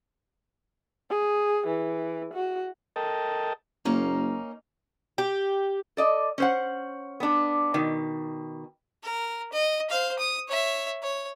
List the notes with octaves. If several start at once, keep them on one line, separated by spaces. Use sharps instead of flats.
G#4
E3
F#4
A4 A#4 D#5 G5 A5
F#1 A#3 C#4 D#4
G4
A4 D5 D#5
C#4 C5 F#5
B3 D4
B2 D#3
A#4
D#5
C5 F5
D#6
C#5 E5
C#5